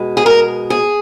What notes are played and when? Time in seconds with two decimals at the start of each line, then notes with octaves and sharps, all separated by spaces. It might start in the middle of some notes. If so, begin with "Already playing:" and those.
Already playing: B2 G#3
0.17 G#4
0.26 A#4
0.70 G#4